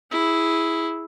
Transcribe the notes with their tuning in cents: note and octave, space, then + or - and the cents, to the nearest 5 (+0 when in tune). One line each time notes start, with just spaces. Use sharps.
E4 -5 G#4 +0